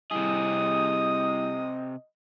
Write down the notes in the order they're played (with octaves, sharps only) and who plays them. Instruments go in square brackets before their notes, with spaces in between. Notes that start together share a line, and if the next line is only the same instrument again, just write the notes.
[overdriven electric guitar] C3 G#4 [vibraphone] G3 E4 [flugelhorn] D#5 [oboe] D#6